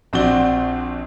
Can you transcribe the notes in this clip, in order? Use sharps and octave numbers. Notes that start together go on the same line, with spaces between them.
A#1 C4 D4 F#4 D5 G7